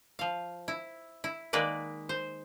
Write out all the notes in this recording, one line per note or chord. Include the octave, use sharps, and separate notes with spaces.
F3 F5
E4
E4
D#3 G#3 A#3 B4 D5
C5